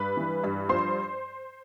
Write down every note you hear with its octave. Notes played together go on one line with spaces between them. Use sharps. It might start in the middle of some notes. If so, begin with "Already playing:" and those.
Already playing: G2 B4 B5
E3
G2
F3 C5 C6